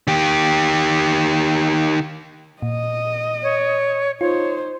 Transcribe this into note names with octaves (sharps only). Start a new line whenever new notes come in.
D#3 G4
A#2 D#5
C#5
D#4 F4 C5 C#5